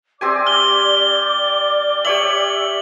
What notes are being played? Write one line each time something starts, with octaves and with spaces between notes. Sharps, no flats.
C4 G4 D5 G#5 D6
F6 G7
G4 C#5 E5 F#7